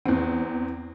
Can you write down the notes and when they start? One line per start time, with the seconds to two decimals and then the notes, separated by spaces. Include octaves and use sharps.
0.05 E2 C4